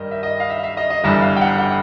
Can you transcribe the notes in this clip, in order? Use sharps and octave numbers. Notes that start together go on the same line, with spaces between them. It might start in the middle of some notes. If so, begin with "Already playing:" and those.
Already playing: G2 D#3 D#5
E5
D#5
F5
E5
E5
D#5
D#5
G1 G2 E3 E5
F5
G5
F#5
F#5